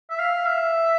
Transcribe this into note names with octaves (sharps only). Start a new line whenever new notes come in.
E5
F5
E5